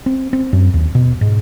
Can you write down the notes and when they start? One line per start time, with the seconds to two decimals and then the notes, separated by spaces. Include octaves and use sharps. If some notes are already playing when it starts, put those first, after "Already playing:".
0.06 C4
0.33 C4
0.53 F#2
0.74 D#2
0.95 B2
1.21 G#2